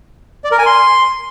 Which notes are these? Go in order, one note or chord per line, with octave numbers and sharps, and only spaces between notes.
D5
A#4
G#5
C6